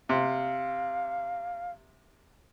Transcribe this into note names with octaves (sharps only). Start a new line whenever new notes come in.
C3 F5